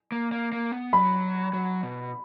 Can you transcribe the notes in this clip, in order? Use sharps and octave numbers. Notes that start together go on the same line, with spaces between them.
A#3
A#3
A#3
B3
F#3 B5
F#3
B2